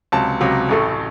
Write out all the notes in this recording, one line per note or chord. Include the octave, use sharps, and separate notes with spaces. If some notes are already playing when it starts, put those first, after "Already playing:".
C#2 C3 F#3 A5
C#2 C3 F#3
A1 A2 A3